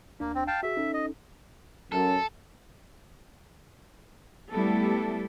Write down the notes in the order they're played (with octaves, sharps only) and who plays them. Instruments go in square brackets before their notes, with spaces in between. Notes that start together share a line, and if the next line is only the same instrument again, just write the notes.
[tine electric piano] D2 D4 [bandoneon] A#3
[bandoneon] C4
F5 G5 A5
[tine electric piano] F#4 G#4 [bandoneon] E5
[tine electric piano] C#4 D#4 A4
[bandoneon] D#5
[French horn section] F#2 [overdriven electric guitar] A4
[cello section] G3 A3 B3 E4 G4 A4